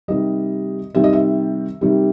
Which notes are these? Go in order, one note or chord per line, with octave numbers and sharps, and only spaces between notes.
C3 D#3 G3 D#5
C3 D#3 G3 E5
D#5
E5
C3 D#3 G3